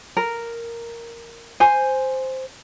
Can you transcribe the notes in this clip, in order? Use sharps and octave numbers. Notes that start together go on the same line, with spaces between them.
A#4
C5 G#5